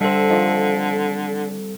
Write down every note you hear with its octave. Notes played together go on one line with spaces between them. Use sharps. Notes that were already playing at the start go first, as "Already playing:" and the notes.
D3 G3 C4 A4 E5
D#3 F3